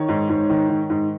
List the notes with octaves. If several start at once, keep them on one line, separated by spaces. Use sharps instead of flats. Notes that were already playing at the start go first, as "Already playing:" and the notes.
Already playing: D#3 C#5
G#2
G#2
D#3
D#3
G#2